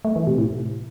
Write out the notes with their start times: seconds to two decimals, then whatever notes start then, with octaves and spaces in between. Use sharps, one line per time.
0.05 A3
0.16 E3
0.27 C3
0.38 A2